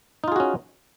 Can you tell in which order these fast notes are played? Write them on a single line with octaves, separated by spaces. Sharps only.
D#4 F4 G#4 F#4 C#4